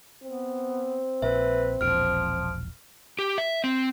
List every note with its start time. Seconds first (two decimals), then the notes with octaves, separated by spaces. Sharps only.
0.23 B3 C4
1.22 A#1 B4 E5
1.81 E1 A#1 F3 F6 D7
3.19 G4
3.38 E5
3.64 C4